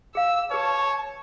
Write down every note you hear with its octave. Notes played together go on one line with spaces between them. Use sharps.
G#4 F5 E6
G#4 B4 C#5 A5